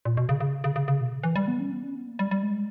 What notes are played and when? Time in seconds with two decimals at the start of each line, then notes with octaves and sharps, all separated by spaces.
0.05 A#2
0.17 B2
0.29 C#3
0.41 C#3
0.64 C#3
0.76 C#3
0.88 C#3
1.01 B2
1.23 E3
1.36 G3
1.48 B3
1.60 C#4
1.72 B3
1.83 C#4
1.95 B3
2.07 A#3
2.19 G3
2.31 G3
2.43 G#3